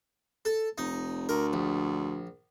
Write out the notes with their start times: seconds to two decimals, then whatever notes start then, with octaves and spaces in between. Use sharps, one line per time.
0.45 A4
0.78 F1 D#4
1.29 D2 A#4
1.53 A#1